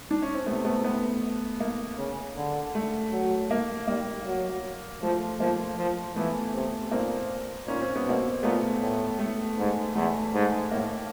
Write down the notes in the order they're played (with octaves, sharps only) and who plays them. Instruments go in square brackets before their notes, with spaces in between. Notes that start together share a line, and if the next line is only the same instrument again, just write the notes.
[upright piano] D4
C#4
C4
[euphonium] C3 [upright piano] A3 B3
[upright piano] A3 B3
A3 B3
A#3
[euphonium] C#3
D3
[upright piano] A3
[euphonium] F#3
[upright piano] A#3
[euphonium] G3 [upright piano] A#3
[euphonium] F#3
[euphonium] F3 [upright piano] A3
[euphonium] F3 [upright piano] A#3
[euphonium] F3
[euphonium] E3 [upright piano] A3 B3
[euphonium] C3
[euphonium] A#2 [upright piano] A#3 C4
[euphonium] A#2 [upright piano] C#4
[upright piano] C4
B3
[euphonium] B2 [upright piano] A#3 C4
[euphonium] A#2 [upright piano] A3 B3
[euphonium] A2
[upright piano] A3
[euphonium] G#2
[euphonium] E2 [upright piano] A3
[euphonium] G#2
[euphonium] A2 [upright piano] A#3